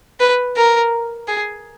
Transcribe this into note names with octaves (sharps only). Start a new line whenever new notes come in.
B4
A#4
G#4